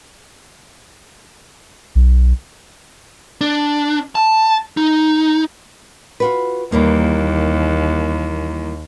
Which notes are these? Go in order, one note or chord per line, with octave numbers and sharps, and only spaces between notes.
B1
D4
A5
D#4
F4 F#4 B4
D#2 E3 G3 A#3